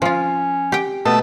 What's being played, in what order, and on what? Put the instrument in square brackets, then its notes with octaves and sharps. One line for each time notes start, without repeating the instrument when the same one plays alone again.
[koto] F3 F4 [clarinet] C#4
[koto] G4 G5
[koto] B2 [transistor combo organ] A3 [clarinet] D#6